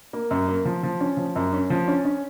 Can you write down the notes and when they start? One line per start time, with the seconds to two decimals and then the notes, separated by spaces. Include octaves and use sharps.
0.13 A#3
0.31 F#2
0.48 A#3
0.65 F3
0.83 F3
1.00 C#4
1.17 F3
1.36 F#2
1.53 C#4
1.70 F3
1.88 C#4
2.05 C#4